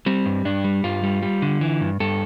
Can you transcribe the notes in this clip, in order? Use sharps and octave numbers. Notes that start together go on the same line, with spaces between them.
G3 C4
G2
G2 D4
G3
G2 F4
G3
G3
D3
E3
G2
G2 A4